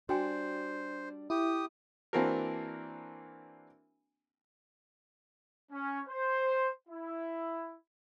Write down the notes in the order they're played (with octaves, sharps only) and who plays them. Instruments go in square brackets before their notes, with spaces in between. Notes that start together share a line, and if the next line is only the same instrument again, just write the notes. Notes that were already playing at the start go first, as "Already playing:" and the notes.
[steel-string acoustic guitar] G3 D4 [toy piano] F#4 G5 G#5 [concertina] C5
[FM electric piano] E4 [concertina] G4 D#6
[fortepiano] E3 A#3 C4 D4 F#4 A#4
[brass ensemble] C#4
C5
E4